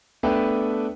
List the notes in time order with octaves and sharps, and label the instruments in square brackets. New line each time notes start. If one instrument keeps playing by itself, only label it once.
[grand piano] A3 B3 D4 B4 E5 G5